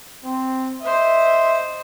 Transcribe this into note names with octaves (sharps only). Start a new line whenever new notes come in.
C4
C5 D#5 E5